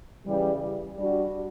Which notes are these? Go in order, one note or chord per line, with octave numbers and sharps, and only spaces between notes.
C#3 E3 G3
G3 D4 F#4